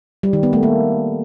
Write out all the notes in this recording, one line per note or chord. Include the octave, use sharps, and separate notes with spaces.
G3
D#3
B3
A3
A#3